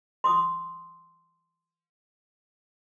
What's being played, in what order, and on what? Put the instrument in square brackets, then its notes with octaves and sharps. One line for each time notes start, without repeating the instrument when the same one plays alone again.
[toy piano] C6 D6 D#6